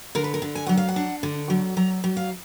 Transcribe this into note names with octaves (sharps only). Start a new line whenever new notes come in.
D3 A#4
B4
A#4
D3
G#5
F#3 F#5
F5
F#5
D4
D3
F#3
F#3 A#5
F#3
F5